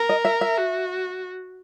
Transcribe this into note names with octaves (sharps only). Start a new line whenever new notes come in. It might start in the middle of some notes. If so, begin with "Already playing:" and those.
Already playing: A#4
D#5
E5
E5
F#4